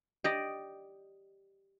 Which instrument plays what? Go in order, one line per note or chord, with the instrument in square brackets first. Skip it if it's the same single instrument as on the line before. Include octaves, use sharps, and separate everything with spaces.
[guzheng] G4 D5 D#5